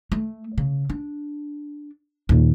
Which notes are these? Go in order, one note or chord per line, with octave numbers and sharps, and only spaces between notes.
A3
C#3
D4
D#2 A#2